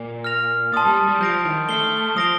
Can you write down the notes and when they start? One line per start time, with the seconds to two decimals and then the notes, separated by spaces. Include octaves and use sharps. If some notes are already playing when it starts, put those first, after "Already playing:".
Already playing: A#2
0.24 F6 A#6 F7
0.73 A#2 A5 C6 D#6 A6
0.84 G3
1.09 G3
1.21 F3 G6 A#6 D7
1.45 D#3
1.69 A3 F6 C7 G7
2.17 F3 D#6 A#6 D7 G7